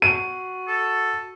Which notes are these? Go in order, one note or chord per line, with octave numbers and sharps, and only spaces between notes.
F#4 D#7
A4